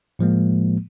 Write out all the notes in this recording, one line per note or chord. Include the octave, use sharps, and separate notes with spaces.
A2 F3 G#3 A#3